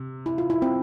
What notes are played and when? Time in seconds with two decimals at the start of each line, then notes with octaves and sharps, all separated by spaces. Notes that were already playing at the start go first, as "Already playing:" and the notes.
Already playing: C3
0.26 E4
0.38 F4
0.50 E4
0.62 C4